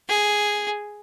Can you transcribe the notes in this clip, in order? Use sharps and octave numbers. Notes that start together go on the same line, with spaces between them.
G#4